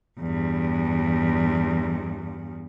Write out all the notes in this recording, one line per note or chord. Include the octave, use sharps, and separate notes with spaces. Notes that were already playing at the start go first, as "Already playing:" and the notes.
E2 G2